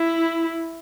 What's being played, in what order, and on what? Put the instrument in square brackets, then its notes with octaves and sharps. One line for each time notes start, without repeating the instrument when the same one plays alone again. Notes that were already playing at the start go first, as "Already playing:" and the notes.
Already playing: [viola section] E4